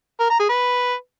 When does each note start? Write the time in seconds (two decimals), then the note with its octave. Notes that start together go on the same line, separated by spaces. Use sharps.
0.20 A#4
0.30 A#5
0.40 G#4
0.49 B4